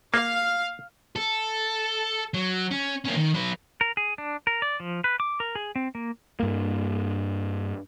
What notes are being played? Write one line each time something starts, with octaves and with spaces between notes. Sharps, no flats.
A#3 F5
A4
F#3
C#4
A#3 C#4
D#3
F#3 B4
A#4
G#4
D4
A#4
D5
F3
B4
D6
A#4
G#4
C4
A#3
G2 A#3